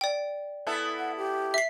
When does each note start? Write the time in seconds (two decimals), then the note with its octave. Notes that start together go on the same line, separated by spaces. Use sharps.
0.01 D5 G5
0.67 B3 E4 A4
0.98 F#5
1.16 G4
1.54 E5 C7